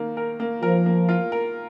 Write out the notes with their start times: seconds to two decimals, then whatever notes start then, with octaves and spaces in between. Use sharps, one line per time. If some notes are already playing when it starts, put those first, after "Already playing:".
Already playing: D#3 A#3
0.17 A#4
0.40 A#3
0.63 F3 A#4
0.86 A#3
1.09 F4
1.32 A#4